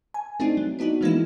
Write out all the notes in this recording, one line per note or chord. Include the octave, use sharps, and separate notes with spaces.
G#5
A3 C4 D4 D#4
F#3
B3 D4 D#4 F#4
E3 F3 G#3 A#3 D#4 E4